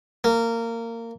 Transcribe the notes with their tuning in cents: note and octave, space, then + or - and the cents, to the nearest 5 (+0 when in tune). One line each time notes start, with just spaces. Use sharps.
A#3 -20